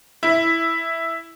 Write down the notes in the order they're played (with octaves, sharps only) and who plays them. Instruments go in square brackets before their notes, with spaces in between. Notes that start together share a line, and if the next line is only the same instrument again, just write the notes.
[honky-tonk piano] E4